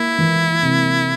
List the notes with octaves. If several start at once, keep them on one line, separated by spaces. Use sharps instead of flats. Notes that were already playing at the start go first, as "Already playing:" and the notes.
Already playing: A#3 E4
E3
C3